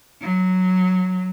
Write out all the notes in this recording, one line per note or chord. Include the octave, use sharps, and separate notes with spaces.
F#3